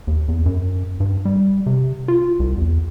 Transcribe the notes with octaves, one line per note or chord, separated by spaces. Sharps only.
D#2
E2
F#2
G2
G3
C3
F4
C2
E2